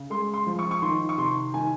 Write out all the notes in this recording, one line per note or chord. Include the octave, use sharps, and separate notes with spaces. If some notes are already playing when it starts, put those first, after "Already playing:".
Already playing: C#3
G#3 C6
C6
F3
C#6
C#6
D#3 C6
C#6
C3 C6
D#3 G#5